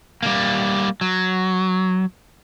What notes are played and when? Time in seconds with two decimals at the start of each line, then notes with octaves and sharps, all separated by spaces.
0.23 G3 A#3
1.01 F#3